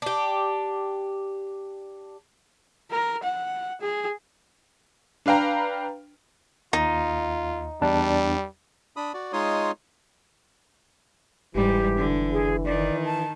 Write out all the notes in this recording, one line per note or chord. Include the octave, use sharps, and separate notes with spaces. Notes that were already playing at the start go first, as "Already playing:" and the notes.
D4 G4
A#4
F#5
G#4
D4 B4 F5 G5 A#5
D#2 D#4 F4
E2 G3 D4 A5
D4 B5 D#6
F#4 D5
G#3 D#4 F4 C#5 C6 D#6
F#1 G#2 E3 G3 G4
D3
G#4
D#3 D5
A5